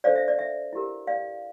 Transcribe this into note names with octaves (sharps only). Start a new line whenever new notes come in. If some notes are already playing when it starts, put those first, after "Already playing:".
D4 A4 C5 D5 F5
E5
D5
E5
E4 G4 A#4
D5 F5